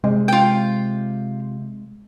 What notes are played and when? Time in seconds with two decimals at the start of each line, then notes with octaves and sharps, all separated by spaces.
0.04 C3 G#3
0.28 F4 G5